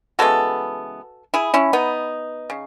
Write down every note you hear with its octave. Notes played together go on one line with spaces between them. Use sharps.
C#3 E3 G#3 B3 F#4 A4
E4 G#4
C#4 E4
B3 D#4
C#3